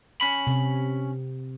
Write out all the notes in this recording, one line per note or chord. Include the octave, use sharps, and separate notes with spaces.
C#4 B5
C3